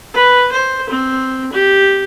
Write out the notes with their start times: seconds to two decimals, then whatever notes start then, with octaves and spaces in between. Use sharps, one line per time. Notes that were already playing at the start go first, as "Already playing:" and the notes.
0.14 B4
0.52 C5
0.90 C4
1.53 G4